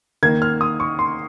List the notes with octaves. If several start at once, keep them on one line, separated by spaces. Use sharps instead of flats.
D#3 A#3 G#6
F6
D#6
C#6
C6